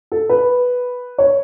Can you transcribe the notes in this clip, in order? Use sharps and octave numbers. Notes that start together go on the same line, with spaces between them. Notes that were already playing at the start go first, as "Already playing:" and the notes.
A4
B4
C#5